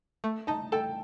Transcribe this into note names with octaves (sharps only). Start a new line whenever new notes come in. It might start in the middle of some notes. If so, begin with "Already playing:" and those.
A3
D#4 A5
A4 G5